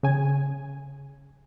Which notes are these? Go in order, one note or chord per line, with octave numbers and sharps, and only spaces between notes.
C#3 G#5